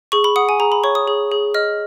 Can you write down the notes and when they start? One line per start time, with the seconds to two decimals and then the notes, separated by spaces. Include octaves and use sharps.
0.12 G#4 C#6
0.24 B5
0.36 F#5 D#6
0.49 G#5
0.60 G#4 A#5
0.72 B5
0.84 C#5 C#6
0.95 D#6
1.08 G#4
1.32 G#4
1.54 D#5 F6